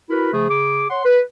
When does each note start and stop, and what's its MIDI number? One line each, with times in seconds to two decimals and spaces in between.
0.10 0.31 64
0.10 0.31 66
0.10 0.31 70
0.10 0.31 71
0.10 0.31 83
0.33 0.48 49
0.33 0.48 53
0.33 0.48 57
0.33 0.48 68
0.49 0.85 49
0.49 0.85 68
0.49 0.85 86
0.89 1.03 73
0.89 1.03 78
0.89 1.03 84
1.04 1.20 71